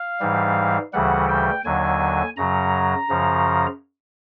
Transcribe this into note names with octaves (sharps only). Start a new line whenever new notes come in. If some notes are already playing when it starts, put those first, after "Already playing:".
Already playing: F5
G#2 E3 G3
D2 C#3 E3 G3 F#5
G5
D#2 D3 F#3 G#5
F#2 C#3 F#3 A#5
F#2 C#3 F3